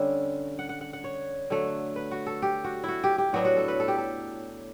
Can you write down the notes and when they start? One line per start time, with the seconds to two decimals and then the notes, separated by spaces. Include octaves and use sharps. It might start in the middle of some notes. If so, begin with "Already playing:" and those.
Already playing: D3 G3 C#4 E5
0.59 F#5
0.69 F#5
0.81 F#5
0.93 F#5
1.04 C#5
1.50 D3 F#3 A3
1.96 B4
2.11 F#4
2.27 A4
2.42 G4
2.64 F#4
2.84 E4 F#4
3.04 G4
3.18 G4
3.33 A2 F#3 B3 D4 F#4
3.45 F#4
3.56 A4
3.68 B4
3.80 A4
3.88 G4
3.98 A4